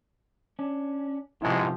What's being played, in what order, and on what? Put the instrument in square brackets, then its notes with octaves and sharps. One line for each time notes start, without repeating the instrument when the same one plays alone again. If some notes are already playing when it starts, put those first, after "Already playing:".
[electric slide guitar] C#4 D4
[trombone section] A1 G#2 G#3 [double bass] C3 F3 [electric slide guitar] E4 G4 C5